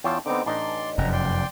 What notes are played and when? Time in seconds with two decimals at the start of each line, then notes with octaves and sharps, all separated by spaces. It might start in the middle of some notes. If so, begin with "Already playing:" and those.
0.04 E2 F4 C#5 G5 A5
0.26 D3 B3 C4 D#4 D6
0.46 A1 D4 D#4 D5 C6
0.98 F1 F#2 A#5
1.13 D5 G5 C6